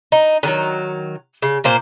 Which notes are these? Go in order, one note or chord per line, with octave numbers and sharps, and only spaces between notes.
D#4
D3 D#3 F#3
C#3
A#2 A#3 C5